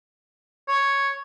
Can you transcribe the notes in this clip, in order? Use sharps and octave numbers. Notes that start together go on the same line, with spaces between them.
C#5